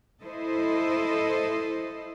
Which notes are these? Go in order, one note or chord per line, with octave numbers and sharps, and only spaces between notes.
E4 A4 C5 D#5